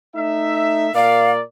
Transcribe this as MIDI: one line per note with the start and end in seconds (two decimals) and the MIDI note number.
0.15 0.89 57
0.15 0.89 63
0.15 0.89 76
0.95 1.42 46
0.95 1.42 70
0.95 1.42 74
0.95 1.31 77